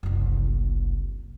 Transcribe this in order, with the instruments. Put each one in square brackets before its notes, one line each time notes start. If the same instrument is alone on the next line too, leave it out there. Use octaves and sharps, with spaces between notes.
[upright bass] F#1 C2